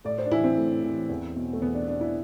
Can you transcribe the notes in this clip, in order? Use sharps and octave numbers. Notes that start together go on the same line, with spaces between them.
A2 D5
C5
D4
E3 E4
C4
A2
E3
E2
B2
A3
E2 B3
D4
B2 D4
E4